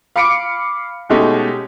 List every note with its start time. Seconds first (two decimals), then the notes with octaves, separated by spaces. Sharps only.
0.16 F5 B5 D6 C#7 D7
1.09 B2 G#3 A3 C#4 D#4 G4